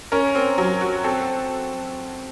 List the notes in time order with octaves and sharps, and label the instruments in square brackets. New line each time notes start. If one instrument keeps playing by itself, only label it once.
[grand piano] C#4 [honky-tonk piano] A#4
[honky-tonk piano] C4
F#3
F#4
[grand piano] C4 [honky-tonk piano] A4